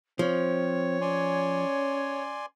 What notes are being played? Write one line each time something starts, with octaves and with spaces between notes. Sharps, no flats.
F3 C4 C#5
C#4 D5 G#5 C6